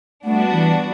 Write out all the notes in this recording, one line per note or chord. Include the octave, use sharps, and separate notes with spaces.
G3 A3 B3 D4 F#4
E3